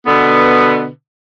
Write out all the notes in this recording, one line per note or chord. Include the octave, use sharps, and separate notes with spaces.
B2 D3 B3